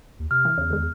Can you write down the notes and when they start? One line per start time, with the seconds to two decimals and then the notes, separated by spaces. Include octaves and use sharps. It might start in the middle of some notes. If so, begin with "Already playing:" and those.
0.19 D#2
0.31 C3 F6
0.45 E3
0.58 E2 C#3
0.70 D#2 G#3